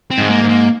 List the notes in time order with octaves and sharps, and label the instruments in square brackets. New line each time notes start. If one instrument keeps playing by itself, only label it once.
[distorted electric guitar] C4
[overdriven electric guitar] G#2 [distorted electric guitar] G#3
[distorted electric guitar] A#3
[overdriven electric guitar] G#2
[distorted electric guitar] A#3